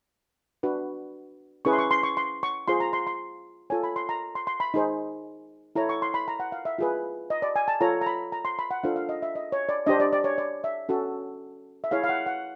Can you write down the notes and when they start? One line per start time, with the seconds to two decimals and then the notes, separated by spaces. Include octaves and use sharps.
0.63 D4 F#4 B4
1.65 C#4 E4 G#4 B4 C#6
1.73 C6
1.79 C#6
1.91 C6
2.03 C#6
2.17 C6
2.43 C#6
2.68 F4 G#4 C5 C6
2.80 A#5
2.93 C6
3.07 C6
3.70 F4 A4 C#5 G#5
3.83 B5
3.96 C6
4.09 A#5
4.35 C6
4.47 C6
4.60 B5
4.74 D#4 G#4 C5
5.76 E4 A4 C#5 A#5
5.89 C#6
6.02 C6
6.14 B5
6.28 A#5
6.40 F#5
6.52 F5
6.65 E5
6.79 F4 G#4 B4
7.30 D#5
7.42 D5
7.56 G#5
7.68 A5
7.81 F4 A4 C#5 A#5
8.01 A#5
8.06 B5
8.32 A#5
8.45 C6
8.59 B5
8.71 F#5
8.83 D4 F4 A4 C5 F5
8.96 F5
9.09 D#5
9.22 E5
9.35 D#5
9.52 C#5
9.69 D5
9.86 D4 G4 C5 D#5
10.00 D5
10.13 D5
10.24 C#5
10.38 D5
10.64 E5
10.89 C#4 F#4 A4
11.84 E5
11.91 E4 G#4 C#5 F5
12.04 F5
12.09 F#5
12.26 F#5